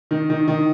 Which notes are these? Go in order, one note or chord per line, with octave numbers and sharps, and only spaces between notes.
D#3
D#3
D#3